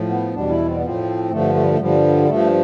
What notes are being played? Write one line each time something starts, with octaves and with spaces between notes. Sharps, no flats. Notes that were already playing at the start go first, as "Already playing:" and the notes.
Already playing: A2 F3
B3
E2 B2 G3 D4
E4
C4
B3
A2 F3 C4
G2 D3 F3 A3
A3
G3
A3
G2 D3 F3 G3
G2 F3 A3